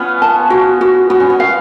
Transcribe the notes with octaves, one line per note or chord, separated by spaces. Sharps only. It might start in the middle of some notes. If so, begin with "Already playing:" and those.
Already playing: B3 C#4 F4
A5
F#4
F#4
B3 F#4
C#4
B3
F5